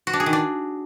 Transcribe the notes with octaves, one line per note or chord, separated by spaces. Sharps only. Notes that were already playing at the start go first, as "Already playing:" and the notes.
F#4
D4
G#4
D#3
D4